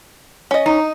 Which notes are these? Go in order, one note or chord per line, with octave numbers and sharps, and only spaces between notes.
C#4 D#5
D#4